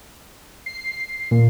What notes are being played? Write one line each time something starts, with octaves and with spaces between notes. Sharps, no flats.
C7
A#2